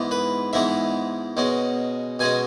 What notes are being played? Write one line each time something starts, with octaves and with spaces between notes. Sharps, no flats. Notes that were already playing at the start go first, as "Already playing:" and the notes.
Already playing: G#2 E3 B3
B4
G#2 E3 B3 E5
B2 G#3 C#4
B2 G#3 C#4 G#5